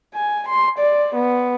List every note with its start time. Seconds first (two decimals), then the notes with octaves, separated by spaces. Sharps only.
0.14 G#5
0.49 C6
0.79 D5
1.15 B3